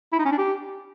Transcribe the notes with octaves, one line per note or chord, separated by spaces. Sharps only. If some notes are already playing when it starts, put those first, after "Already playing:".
E4
D#4
C#4
D4
G4